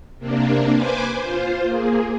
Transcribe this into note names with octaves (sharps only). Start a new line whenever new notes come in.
C3 A#3 D4
B4 C5 G#5 D6
F4 C5
A#3 G#4